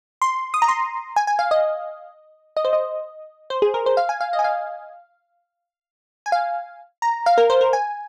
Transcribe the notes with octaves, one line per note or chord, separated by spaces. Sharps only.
C6
D#6
A#5
C6
G#5
G#5
F5
D#5
D#5
C5
D#5
C5
G#4
A#4
C5
F5
G#5
F5
D#5
G#5
F5
G#5
F5
A#5
F5
A#4
C5
A#4
G#5